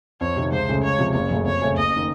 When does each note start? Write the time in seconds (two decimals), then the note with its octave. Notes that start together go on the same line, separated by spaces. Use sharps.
0.21 F2 C#5
0.36 C3 D#3
0.52 C#2 C5
0.68 C#3 A3 C#4
0.83 C#2 C#5
0.98 C3 F3
1.14 F#1 C#5
1.30 F#2 C#3 A3
1.45 F2 C#5
1.62 C#3 A3 C#4
1.77 F#1 D#5
1.96 D#3